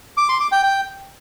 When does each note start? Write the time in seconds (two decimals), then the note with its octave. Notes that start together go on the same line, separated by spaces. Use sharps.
0.17 D6
0.29 C6
0.40 D6
0.52 G5
0.63 G5